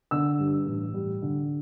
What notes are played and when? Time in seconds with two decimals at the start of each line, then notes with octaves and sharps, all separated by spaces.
0.11 D3 E6
0.39 G2
0.66 A1
0.94 G3
1.22 D3